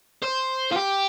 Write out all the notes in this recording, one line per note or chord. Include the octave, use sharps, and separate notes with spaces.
C5
F4
G4